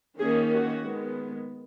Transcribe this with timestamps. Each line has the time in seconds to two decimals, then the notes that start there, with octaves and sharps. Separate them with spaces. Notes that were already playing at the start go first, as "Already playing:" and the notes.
0.18 D#3 A#3 C#4 G#4
0.50 F#4
0.82 D#3 G#3 B3